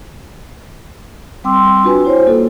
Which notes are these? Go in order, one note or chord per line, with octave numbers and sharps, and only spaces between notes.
G3 C4 G5 C6 D6 E6
D4 F4 F#4 B4 G#5
E4 F#4 C5 C#5
A#3 F4 A4